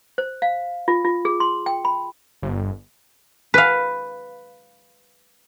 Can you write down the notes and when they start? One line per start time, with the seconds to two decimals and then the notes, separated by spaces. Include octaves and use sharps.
0.18 C5
0.42 F5
0.88 F4
1.05 F4
1.25 G#4
1.40 C6
1.66 G5
1.85 B5
2.43 G1
3.54 B4 F5